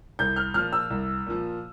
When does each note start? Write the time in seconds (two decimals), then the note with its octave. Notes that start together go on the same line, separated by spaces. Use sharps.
0.19 C2 G6
0.36 F6
0.54 A#2 F3 F6
0.73 E6
0.90 C2
1.27 A#2 F3